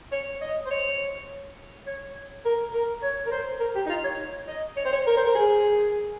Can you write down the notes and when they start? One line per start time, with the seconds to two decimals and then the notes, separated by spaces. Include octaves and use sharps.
0.12 C#5
0.42 D#5
0.66 C5
0.71 C#5
1.86 C#5
2.45 A#4
2.74 A#4
3.03 C#5
3.26 A#4
3.31 C5
3.60 A#4
3.75 G4
3.86 D#4
3.89 F4
4.04 C#5
4.48 D#5
4.77 C#5
4.85 C5
4.93 C#5
5.07 A#4
5.17 C5
5.26 A#4
5.35 G#4